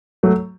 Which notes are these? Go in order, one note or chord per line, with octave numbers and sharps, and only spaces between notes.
F#3 A3